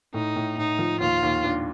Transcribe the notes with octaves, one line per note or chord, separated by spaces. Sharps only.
A2 D#4
A2
A2 D#4
F3
D#2 F4
D#2
D4